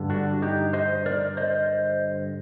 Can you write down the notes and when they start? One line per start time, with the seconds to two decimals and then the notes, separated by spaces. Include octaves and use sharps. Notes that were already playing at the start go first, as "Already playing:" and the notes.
Already playing: G2 D3
0.10 D4 F#4
0.42 D#4 G4
0.73 C5 D#5
1.06 A#4 D5
1.37 C5 D#5